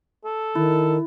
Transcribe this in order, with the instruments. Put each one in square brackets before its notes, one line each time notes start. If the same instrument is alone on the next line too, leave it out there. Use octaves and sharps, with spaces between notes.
[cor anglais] A4
[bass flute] D#3 [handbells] E4